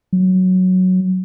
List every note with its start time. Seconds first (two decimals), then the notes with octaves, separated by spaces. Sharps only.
0.13 F#3